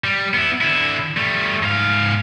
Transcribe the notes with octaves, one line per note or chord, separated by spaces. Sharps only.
G3
B3 E4
D3 E4
G3 A3
G#2 F5